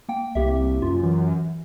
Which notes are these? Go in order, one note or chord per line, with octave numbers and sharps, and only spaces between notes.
A#3 G5
C2 A#3 G4 E5
F#2 F4
E3